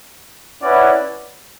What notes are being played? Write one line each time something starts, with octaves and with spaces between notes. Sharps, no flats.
C#4 E4 B4 D5 F#5